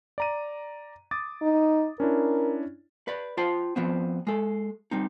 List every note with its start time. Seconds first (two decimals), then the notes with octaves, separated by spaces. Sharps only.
0.18 D5 A#5 D#7
1.11 D6 D#6 A6
1.42 D#4
2.00 C#4 D4 E4 A#4
3.08 B4 D5
3.37 F4 C5 G5 A5
3.76 F3 B3 C4
4.27 G#3 A4
4.91 G3 C4 D#4